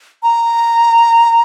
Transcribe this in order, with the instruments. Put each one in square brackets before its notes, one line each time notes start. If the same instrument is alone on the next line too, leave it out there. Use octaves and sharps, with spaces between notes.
[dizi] A#5